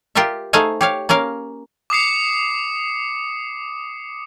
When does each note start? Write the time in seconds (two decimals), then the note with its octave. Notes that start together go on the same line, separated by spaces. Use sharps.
0.15 F4 G4 A#4 D5 E5
0.53 A3 D#4 G#4 C5 F5 G#5
0.81 G4 C#5 F5
1.09 A#3 C#4 A#4 F5
1.90 D6 D#6 C7 C#7